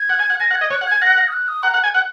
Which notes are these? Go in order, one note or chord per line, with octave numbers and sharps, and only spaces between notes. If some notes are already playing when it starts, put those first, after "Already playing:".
Already playing: G#6
F#5
G#5
F#5
G#5 A#6
F#5
G#6
D#5
C#5 F#6
F#5
G#6
G#5
F#5 A#6
A#6
D#6
F#6
D#6
F#5 A#5
F#5
G#5
F#5